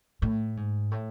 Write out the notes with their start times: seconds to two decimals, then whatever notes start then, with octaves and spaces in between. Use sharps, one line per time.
0.22 A2
0.57 G#2
0.91 A2